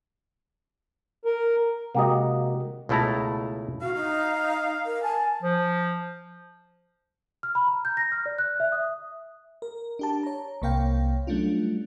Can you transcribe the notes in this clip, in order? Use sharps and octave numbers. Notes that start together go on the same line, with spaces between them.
A#4
C3 G#3 A#3 F#4 G4 D#5
C#2 B2 A3 E4 A5 A#5
F#4 F5
D#4
A#4
G#5 A5
F3
F6
B5
A#5
G6
A#6
F6
D5
F#6
E5
D#6
A#4
D4 G4 A5
C#5 A#5
C2 C3 A#3 C#5 F5 G5
F#3 G3 A3 C#4 D4 F4